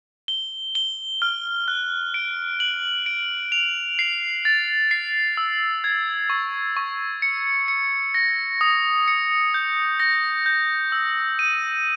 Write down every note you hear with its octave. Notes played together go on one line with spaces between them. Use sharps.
G7
G7
F6
F#6
D7
F#7
D7
F7
C7
A6
C7
E6
G#6
C#6
C#6
C#7
C#7
A#6
D#6
C#7
G6
A#6
G6
E6
D#7